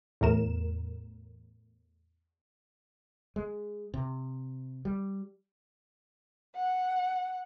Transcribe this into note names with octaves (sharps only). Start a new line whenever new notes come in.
E2 A2 A#4 E7
G#3
C3
G3
F#5